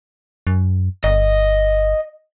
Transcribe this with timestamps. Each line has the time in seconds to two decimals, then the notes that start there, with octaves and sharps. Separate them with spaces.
0.47 F#2
1.04 G1 D#5